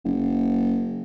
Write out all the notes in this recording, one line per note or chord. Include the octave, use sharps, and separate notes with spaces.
F#1